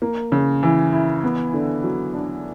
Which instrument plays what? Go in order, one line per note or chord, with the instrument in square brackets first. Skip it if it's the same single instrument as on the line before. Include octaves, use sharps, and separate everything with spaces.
[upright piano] A#3
C#3
E3
E4
B3
D3
F#3
D4